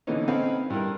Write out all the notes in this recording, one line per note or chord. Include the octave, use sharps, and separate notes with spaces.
A#2 D3 E3 B3 C#4 D#4
C4 C#4 A4 B4 D#5 F5
G2 E4 A#4